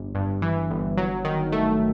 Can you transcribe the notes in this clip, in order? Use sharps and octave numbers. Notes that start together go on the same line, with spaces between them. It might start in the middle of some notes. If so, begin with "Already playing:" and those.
Already playing: G1
G2
E3
G1
F#3
D#3
A3